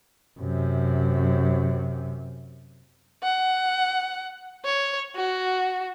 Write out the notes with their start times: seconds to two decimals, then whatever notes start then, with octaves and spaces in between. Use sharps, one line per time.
0.40 F#2 C3
3.23 F#5
4.65 C#5
5.15 F#4